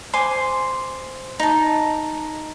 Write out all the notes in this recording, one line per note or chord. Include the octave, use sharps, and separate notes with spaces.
C5 G#5 C6 D6
D#4 A5